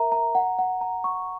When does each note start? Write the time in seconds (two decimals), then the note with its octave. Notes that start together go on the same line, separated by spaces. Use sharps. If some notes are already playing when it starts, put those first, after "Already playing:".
Already playing: A#4 E5 A#5
0.12 A#5
0.35 F#5
0.59 F#5
0.81 A#5
1.04 C#6